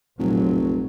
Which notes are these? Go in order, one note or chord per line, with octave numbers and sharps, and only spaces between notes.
F1 A#1 A#2 F#3